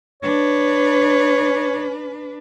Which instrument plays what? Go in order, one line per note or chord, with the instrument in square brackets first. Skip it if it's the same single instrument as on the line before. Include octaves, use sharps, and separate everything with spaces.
[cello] D4 B4 [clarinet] C#5